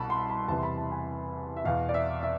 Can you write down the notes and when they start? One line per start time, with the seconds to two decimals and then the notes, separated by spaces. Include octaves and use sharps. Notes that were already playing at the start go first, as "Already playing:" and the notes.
Already playing: C2 B2 A5 B5
0.10 C6
0.30 B5
0.48 E2 C3 E3 A5
0.58 C6
0.63 B5
0.78 A5
0.92 G#5
1.57 E5
1.64 E2 B2 F5
1.89 D5
1.94 E5
2.23 E5